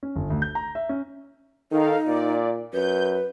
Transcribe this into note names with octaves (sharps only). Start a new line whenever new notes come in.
C#4
G1
D2
G6
A#5
E5
C#4
D#3 D#4 A4 A#4 F5
A#2 D5
F#2 B4 G6